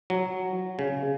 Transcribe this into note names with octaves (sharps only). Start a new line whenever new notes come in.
F#3
C#3